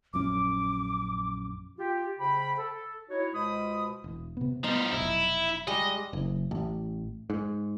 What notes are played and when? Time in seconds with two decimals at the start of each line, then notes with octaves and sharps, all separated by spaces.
0.13 A#1 F#2 C#4 D6
1.77 F4 G4
2.19 C#3 C5 G5 B5
2.57 A4
3.10 D#4 E4 F#4 C#5
3.33 C#2 B2 G#3 C5 B5 D#6
4.04 E1
4.37 C3 B3
4.64 F3 G3 B3 D#4
4.93 F1 B1 E4
5.67 G3 G#3 D#5
6.13 F#1
6.51 A1
7.30 G#2